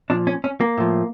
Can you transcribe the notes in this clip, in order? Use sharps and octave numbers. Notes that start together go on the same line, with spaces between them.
A#2 F3 D4
C#4
C#4
A#3
A2 F3